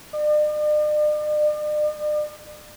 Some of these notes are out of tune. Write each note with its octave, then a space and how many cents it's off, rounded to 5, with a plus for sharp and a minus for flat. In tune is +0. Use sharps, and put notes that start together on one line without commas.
D5 +45